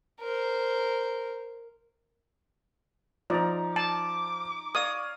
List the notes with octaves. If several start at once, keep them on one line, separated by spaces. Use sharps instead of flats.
A#4 C5
F3 D#4 D5 A#5
A5 D6
C#5 D5 F5 D#6